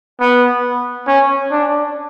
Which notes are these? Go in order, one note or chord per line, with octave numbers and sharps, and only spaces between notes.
B3
C#4
D4